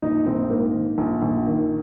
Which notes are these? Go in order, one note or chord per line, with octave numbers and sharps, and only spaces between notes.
A#1 D#4
A#1 C4
G#2 A#3
D#3
A#1
A#1
D#3